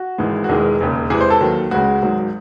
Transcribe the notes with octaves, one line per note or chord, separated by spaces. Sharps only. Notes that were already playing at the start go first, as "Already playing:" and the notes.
Already playing: F#4
G#1 G#2 E3 G#3
F#4
E1 E2 D#3 G#3 G#4
E1 D#2 C#3
E2 C3 E3 G#3 G#4
C5
A4
D#2 D#3 F#3
C#2 C#3 G#3 F#4
G#1 G#2 F#3